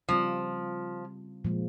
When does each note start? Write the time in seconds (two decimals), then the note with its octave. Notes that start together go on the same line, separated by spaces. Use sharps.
0.09 C#3 F3 G3 C4 F4
1.45 A#2 F3 G#3